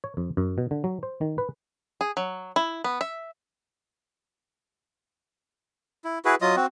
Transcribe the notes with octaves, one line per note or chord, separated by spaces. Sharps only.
C#5
F2
F#2
B2
D3
F#3
C5
D#3
B4
G#4
F#3
E4
B3
E5
E4
E4 F#4 G#4 B4
F#3 F4 D#5 D#6
C4 F#4